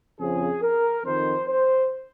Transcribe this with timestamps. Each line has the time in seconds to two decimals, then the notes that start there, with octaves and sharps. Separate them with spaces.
0.19 F2 C#3 F3 G#4
0.62 A#4
1.04 F2 D#3 C5
1.48 C5